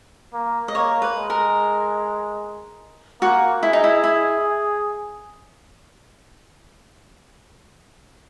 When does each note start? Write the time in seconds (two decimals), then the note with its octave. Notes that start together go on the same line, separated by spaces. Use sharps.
0.34 A#3
0.68 D#5
0.75 A#3 C#5
1.02 B4
1.16 G#3
1.30 A#4
3.22 A#3 F#4
3.62 E4 G#4
3.73 D#4
3.84 E4
4.04 E4